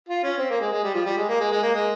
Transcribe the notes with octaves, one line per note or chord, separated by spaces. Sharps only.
F4
C#4
C4
A#3
G#3
G#3
G3
F3
G3
G#3
A#3
G#3
G#3
A#3
G#3